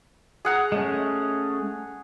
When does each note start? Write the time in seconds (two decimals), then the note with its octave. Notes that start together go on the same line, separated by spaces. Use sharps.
0.45 G#4 F#5 A#5
0.72 G#3 A3 C#4